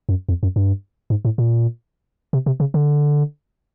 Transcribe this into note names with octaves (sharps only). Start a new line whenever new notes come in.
F#2
F2
F#2
G2
G#2
A2
A#2
C3
C3
C#3
D3